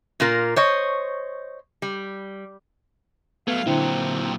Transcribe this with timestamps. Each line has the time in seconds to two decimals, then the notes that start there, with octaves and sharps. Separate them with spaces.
0.20 A#2 A#3 F4 A#4
0.56 C5 C#5 D#5
1.82 G3
3.48 F#3 A3 B3 F5 G#6
3.66 A#2 D3 F#3 C4 E4